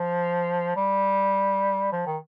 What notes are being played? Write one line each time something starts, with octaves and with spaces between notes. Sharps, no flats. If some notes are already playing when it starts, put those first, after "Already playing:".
Already playing: F3
G3
F3
D#3